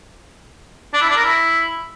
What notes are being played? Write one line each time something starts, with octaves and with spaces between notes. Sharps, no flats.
D4
E4
D4
A#4
E4